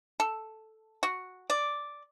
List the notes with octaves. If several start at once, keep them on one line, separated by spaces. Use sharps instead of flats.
A4
F#4
D5